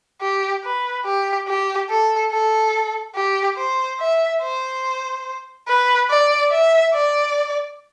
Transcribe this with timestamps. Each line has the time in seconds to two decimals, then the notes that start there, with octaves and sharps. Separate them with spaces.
0.21 G4
0.64 B4
1.05 G4
1.48 G4
1.90 A4
2.32 A4
3.15 G4
3.57 C5
4.00 E5
4.42 C5
5.68 B4
6.10 D5
6.51 E5
6.93 D5